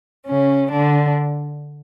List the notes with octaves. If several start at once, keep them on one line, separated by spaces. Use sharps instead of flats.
C#3 C#4
D3 D4